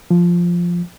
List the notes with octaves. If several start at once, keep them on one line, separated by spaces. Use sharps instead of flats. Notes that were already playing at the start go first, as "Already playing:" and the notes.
F3